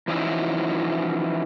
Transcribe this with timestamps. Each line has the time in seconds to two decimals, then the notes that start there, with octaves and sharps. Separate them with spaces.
0.08 E3 F3 C#4 D#4 E4 F#4